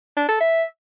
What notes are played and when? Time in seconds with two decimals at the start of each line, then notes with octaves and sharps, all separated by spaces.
0.17 D4
0.29 A4
0.41 E5